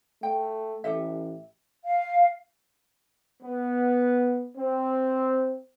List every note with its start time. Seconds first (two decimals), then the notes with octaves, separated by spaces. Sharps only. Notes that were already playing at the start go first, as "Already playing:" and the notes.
0.23 A3 G5
0.84 A1 G4 A4 E5
1.84 F5
3.43 B3
4.57 C4